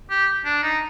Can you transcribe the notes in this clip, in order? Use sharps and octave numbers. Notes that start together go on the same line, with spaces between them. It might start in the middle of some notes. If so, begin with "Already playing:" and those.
G4
D4
D#4